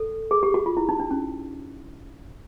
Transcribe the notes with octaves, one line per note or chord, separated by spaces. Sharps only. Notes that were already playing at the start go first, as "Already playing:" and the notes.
Already playing: A4
G#4
G4
F#4
F4
E4
D#4
D4
C#4